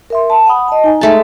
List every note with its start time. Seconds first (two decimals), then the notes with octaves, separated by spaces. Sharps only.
0.10 A#4 E5 C6
0.30 A5
0.46 F#5 B5 D#6
0.68 D#5 A5
0.84 D#4 G#5 A#5
1.01 G#3 A3 A5